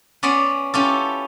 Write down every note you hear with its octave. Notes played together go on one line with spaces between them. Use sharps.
B3 C#4 D5 B5 C6
C#4 E4 F4 G4 A4